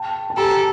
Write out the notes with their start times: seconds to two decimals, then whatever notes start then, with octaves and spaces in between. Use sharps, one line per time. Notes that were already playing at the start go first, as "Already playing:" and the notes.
Already playing: G5 A5
0.30 A5
0.37 G4 A4 G#5 A#5